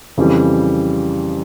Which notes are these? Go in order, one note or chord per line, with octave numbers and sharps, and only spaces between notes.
F2 C#3 E3 G3